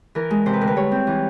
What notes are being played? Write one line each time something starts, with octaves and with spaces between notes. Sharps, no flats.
E3 A#4
G#3
C3 C5
B4
D2 A#4
B4
G3 C#5
C4
E3